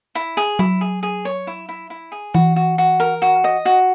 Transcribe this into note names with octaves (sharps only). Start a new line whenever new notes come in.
E4
G#4
F#3 E4
G#4
G#4
C#5
E4
E4
E4
G#4
E3 F#4
F#4
F#4
A#4
F#4
D#5
F#4